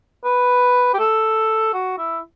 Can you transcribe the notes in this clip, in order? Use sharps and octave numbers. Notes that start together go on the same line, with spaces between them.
B4
G4
A4
F#4
E4